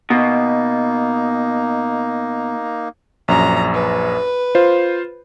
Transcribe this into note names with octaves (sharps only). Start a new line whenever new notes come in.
B2 A#3 D#4
A#1 F#2 A#5
B4
F4 C5